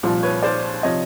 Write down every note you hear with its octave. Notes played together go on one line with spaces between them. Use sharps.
C2 A#2 F3
B4 C#5
C5 D5
C3 F3 C#5 D#5